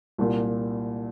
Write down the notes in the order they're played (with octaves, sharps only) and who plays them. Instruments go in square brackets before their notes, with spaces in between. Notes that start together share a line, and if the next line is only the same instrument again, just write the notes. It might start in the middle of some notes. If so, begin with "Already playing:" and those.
[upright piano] C2 A#2 A#3